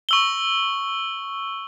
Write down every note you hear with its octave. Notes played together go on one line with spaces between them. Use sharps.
C#6 E6 G7